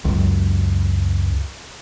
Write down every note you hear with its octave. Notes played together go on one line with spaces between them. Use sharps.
C#2 F#2